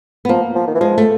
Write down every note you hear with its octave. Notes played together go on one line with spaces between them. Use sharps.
B3
F3 A#3
F3
D#3
E3
F3 G#3
A3